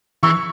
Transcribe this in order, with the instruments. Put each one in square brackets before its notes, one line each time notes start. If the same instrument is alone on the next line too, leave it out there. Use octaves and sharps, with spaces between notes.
[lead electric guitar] E3 [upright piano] C#6 E6